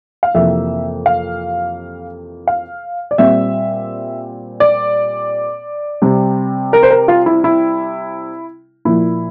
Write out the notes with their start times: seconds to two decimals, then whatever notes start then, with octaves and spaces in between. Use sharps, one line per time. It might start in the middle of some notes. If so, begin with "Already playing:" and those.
0.23 F5
0.35 F2 C3 E3 A#3 E5
1.06 F5
2.47 F5
3.11 D5
3.18 A#2 G3 C4 E5
4.60 D5
6.02 C3 G3 C4
6.73 A#4
6.83 C5
6.91 A#4
7.08 F4
7.26 E4
7.44 E4
8.85 A#2 F3 A#3 E4